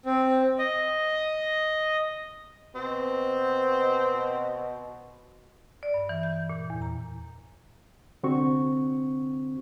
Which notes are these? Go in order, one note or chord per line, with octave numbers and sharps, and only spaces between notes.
C4
D#5
B2 C4
D5
G2
E3
G6
A#2
E2
A#5
C2 D3 C4 F#4 C#6